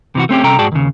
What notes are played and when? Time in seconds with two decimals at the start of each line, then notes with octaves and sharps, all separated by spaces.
0.15 C3 E3 F#4
0.29 A3 C4 C#4 G4
0.44 C2 C3 C#4 A4 G5 A#5
0.59 G#2 F#4 G#4 D5 G5 A5
0.72 D#2 C#3